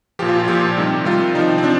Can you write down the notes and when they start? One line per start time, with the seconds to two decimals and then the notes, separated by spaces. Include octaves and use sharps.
0.19 A#2 F3 G4
0.29 F4
0.39 F4
0.48 A#2 F3 G4
0.77 C3 D#3 G3
1.05 C3 D#3 G3 F4
1.34 C3 F3 D#4
1.58 C4
1.64 F3 D4